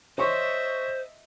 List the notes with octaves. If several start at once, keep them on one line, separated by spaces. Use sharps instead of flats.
C5 C#5 D#5 E5 C6 C#6